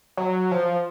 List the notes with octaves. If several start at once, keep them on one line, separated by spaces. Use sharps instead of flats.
F#3
F3